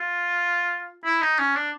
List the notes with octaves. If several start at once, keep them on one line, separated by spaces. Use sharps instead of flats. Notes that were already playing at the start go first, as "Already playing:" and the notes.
Already playing: F4
E4
D#4
C#4
D4